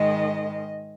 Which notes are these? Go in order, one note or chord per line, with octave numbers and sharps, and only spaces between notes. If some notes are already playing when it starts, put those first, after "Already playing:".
Already playing: G#2 D#3 G#3 D#5